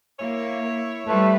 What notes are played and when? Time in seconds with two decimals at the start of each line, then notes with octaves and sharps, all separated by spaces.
0.20 A#3 E4 C#5 E5
1.07 G3 A3 B4 C5